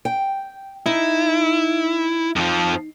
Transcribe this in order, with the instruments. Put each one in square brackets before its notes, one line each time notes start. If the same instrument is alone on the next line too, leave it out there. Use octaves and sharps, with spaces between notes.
[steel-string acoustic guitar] G5
[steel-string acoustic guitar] D#4 [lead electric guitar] E4
[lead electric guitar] F2 F3